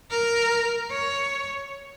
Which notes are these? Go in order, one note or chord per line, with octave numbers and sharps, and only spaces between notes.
A#4
C#5